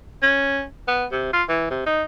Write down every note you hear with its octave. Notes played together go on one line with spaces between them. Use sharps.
C#4
B3
C3
F4
E3
C3
D#4